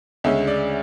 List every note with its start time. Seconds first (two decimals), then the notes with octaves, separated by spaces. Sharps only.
0.24 D2 C#3 G#3 C#4 E5
0.47 D5